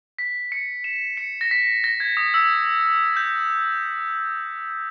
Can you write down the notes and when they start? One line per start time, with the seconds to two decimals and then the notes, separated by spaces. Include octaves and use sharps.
0.19 B6
0.52 C#7
0.84 E7
1.17 C#7
1.41 A#6
1.51 B6
1.84 A#6
2.00 G#6
2.17 D#6
2.34 E6
3.17 G6